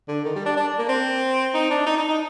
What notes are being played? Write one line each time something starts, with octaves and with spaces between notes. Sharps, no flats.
D3
D#3
G3
D4
D4
A#3
C4
D#4
D4
D#4
D#4
D#4